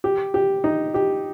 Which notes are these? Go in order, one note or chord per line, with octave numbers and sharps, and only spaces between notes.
G4
G4
D#4
G4